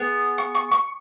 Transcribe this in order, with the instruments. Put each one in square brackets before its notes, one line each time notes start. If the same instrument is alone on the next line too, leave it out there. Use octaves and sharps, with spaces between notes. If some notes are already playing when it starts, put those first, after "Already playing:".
Already playing: [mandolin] B3 G#4
C#6
C#6
C#6